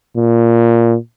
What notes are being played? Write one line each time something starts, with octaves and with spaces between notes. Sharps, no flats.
A#2